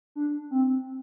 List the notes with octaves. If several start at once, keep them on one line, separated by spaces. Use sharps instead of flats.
D4
C4